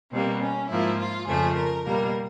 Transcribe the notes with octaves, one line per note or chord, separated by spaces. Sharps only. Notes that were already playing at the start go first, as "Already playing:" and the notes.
B2 G3 A#3 C4
C#4
G#2 F3 A#3 E4
F4
F2 C#3 F3 A3 G#4
A#4
B2 G3 A#3 A#4